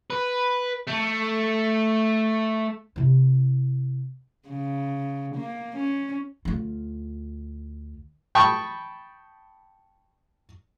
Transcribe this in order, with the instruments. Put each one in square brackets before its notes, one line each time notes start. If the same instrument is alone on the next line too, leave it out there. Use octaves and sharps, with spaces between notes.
[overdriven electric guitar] B4
A3
[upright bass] C3 E4
[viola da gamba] C#3
A#3
C#4
[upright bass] D2 F4
[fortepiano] G5 A5 B5 C#6 D#6